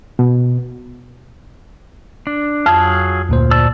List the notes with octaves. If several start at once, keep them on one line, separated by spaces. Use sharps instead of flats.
B2
D4
F2 F#3 G#4 F5
D2 A#2 C5
D5 A5 E6